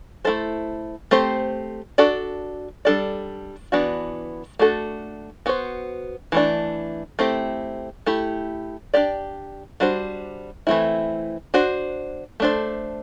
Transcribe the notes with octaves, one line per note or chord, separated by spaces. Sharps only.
A3 E4 A4 C5
A3 C4 G4 C5
D4 F#4 A4 D5
G3 D4 A4 D5
E3 B3 D4 F#4
A3 D4 F#4 A4
B3 F#4 C5
E3 A3 D4
A3 C4 E4 G4
A3 E4 G4
D4 G4 D5
G3 D4 F#4 C5
E3 A3 C4 E4
D4 F#4 C5
A3 D4 A4 C5